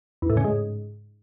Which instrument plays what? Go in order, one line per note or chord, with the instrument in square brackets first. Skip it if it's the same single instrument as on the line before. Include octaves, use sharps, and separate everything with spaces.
[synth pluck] E2
A2
C#3
G#2